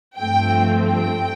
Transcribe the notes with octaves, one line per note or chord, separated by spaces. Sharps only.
G2 F3 A3 C4 G5
G5